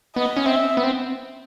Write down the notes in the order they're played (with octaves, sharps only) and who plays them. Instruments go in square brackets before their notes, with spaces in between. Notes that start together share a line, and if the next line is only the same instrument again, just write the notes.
[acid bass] B3 [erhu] D#5
[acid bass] C#4
[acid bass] C4 [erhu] E5
[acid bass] B3
C4